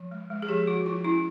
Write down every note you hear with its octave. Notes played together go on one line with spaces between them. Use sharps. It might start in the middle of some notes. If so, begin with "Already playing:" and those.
Already playing: F3
G#3
G#3
G#4
F3 G4
F3 F#4
F3 F4
C#4 E4